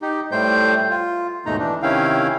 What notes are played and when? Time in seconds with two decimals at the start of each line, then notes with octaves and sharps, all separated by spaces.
0.02 D#4 G4
0.32 A2 G3 A3 C5 G5 G6
0.90 F4
1.46 D#2 G#2 B2 A3 D#4 A#5
1.59 E3 D4
1.82 C3 D#3 C#4 E4 F5 G5